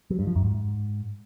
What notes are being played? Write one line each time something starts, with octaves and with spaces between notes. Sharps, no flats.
F#3
G2
F3
F#2
G#2